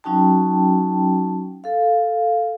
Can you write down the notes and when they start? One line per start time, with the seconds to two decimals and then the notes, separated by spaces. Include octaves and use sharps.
0.04 F#3 C#4 D#4 F#4 G5 A5
1.64 A4 F5